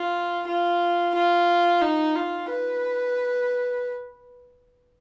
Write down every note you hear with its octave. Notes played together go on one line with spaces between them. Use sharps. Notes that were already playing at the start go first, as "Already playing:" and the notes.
Already playing: F4
F4
F4
D#4
F4
B4